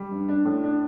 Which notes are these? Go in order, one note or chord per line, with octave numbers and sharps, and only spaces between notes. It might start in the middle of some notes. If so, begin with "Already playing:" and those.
Already playing: G3
G2
D4
A2
D4